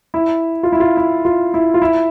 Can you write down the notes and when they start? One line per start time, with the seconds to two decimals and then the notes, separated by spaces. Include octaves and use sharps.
0.14 E4
0.63 F4
0.72 E4
0.80 F4
0.97 E4
1.25 F4
1.54 E4
1.74 F4
1.82 E4